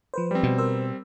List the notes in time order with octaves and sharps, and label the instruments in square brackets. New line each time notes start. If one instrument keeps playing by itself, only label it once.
[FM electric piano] F3 B4 C5
[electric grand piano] G3 C4
[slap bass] B2
[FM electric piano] A#4 C5 E6